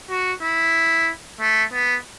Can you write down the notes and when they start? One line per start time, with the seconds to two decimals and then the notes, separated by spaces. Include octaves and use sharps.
0.10 F#4
0.43 E4
1.40 A3
1.73 B3